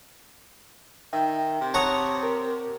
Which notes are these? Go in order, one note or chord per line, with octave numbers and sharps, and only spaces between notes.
D#3 E5 G5
C3
C#5 F#5 A5 A#5 D#6
A#4